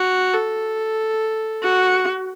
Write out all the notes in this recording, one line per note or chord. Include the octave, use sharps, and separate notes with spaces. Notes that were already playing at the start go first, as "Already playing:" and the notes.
Already playing: F#4
A4
F#4